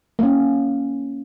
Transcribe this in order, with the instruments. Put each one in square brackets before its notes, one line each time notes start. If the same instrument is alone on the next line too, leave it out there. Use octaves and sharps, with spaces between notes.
[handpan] A#3 C#4